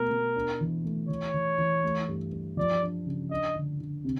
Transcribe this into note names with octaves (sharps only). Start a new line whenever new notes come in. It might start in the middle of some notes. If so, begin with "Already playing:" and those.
Already playing: B2 A3 A#4
B2
D4
E3
A3
E3 C#5
E3
E3
A3
G2
G2
F3 D5
D4
C#3
D4 D#5
D3
D3
C3